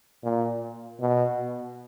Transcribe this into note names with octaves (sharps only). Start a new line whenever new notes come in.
A#2
B2